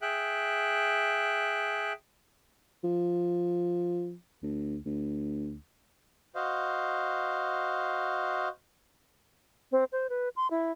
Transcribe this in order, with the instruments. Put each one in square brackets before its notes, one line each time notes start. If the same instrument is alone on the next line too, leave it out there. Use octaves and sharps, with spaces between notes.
[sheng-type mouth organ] G#4 E5 G5 F#6
[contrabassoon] F3
D2
D2
[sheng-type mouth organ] F#4 C5 D#5 F5
[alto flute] C4
C5
B4
C6
E4